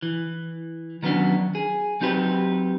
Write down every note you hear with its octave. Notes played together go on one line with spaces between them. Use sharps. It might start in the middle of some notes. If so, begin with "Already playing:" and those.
E3
D#3 F#3 B3 C#4 D4
G#4
F#3 C4 D#4 G4 B4